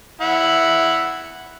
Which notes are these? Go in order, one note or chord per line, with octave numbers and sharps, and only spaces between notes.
E4 F#5